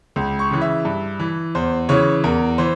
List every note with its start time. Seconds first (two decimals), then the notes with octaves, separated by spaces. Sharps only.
0.16 C#2
0.39 C#6
0.51 C#3 E3
0.61 E5
0.85 G2
1.20 E3
1.55 E2 C5
1.89 C#3 E3 C#5
2.24 E2 A#4
2.58 E3 C5